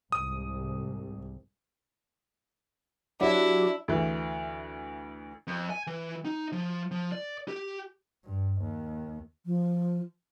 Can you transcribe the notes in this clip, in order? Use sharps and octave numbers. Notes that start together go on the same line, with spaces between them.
C2 G#2 D#6
F#3 D4 E4 G4
D2 E3
F2
G#5
E3
D#4
F3
F3
D5
G4
G2
D#2
F3